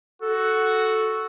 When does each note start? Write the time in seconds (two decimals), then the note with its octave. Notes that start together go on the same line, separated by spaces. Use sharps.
0.22 F#4 A4